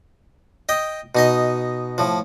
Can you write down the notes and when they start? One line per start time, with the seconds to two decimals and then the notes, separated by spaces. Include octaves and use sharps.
0.69 D#5 G5
1.15 B2 D#4 D#5
1.98 A2 F3